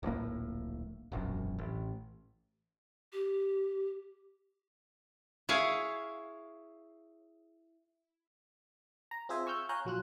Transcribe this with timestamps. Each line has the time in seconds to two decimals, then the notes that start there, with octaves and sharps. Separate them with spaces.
0.03 D1 A#1 A2 A#3
1.12 E1 A#1 F#2
1.58 A1
3.13 G4
5.49 E4 G#4 C#5 F5
9.11 A#5
9.29 C4 F4 G#4 C5 E5 G#5
9.46 G#5 C#6 E6 F6 G6
9.69 C#5 F5 G#5 A#5 F#6 G6
9.85 A#1 F#3 F4 F#6